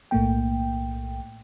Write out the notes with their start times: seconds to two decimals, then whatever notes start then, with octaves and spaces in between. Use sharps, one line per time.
0.11 B1 A2 A3 A#3 G5